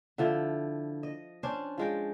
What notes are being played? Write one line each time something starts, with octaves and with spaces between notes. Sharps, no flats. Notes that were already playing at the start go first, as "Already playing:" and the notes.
D3 F3 E4
D#5
C#4 D4 C5
F3 G#3 G5